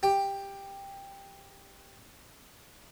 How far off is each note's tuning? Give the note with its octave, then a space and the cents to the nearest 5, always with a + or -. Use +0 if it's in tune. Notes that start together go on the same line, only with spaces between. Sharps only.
G4 +10